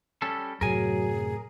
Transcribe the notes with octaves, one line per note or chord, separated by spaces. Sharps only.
G3 C#4 A4
F#2 A2 C3 F#3 G#4 A#4 G#5